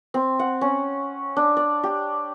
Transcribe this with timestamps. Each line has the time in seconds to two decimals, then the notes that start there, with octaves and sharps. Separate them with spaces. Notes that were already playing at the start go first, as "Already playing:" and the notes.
0.14 C4
0.39 F#5
0.61 C#4
1.36 D4
1.57 D5
1.83 G4